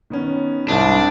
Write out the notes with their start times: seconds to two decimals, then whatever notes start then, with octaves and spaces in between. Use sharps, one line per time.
0.10 D#3 B3 C#4
0.69 C2 G#2 D4 D7